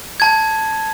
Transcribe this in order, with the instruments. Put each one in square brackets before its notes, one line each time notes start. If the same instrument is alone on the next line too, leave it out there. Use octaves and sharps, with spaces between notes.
[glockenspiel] A5 G#6